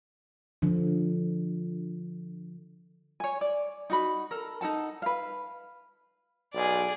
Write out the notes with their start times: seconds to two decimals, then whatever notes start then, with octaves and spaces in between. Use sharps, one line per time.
0.62 D3 F3
3.20 C#5 G#5
3.41 D5
3.90 D#4 F#4 B5
4.31 A4 A#4
4.61 D#4 A4 F#5 A5
5.02 B4 F5
6.54 B1 G#4 D5